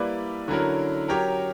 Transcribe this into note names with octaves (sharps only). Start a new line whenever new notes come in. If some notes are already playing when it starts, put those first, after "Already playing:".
Already playing: G3 A#3 E4 B4 D5
D3 F#3 C#4 E4 A#4
F#3 C#4 G4 A#4 C#5